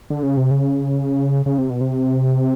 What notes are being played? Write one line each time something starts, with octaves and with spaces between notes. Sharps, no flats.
D3
C#3
C3
C#3
C#3
C3
B2
C3